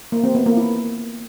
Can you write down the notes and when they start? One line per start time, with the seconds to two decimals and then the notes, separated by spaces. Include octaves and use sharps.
0.12 A#3
0.24 C4
0.35 B3
0.46 A#3
0.57 E4